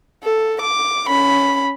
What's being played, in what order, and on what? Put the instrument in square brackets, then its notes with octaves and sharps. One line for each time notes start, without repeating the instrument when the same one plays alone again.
[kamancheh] A4
D6
C#4 B5